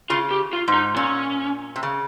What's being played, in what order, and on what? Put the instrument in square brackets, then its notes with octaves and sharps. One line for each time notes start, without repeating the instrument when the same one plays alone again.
[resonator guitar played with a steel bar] C#3 [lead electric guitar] F4
[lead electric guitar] G4
F4
[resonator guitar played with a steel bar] G#2
[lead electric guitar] D#4
[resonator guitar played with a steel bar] A#2 [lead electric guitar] C#4
[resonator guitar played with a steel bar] C3
C#3